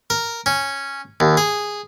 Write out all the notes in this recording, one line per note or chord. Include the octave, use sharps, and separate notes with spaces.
A#4
C#4
D#2
G#4